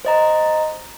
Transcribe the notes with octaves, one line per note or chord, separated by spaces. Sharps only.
C5 D#5 A#5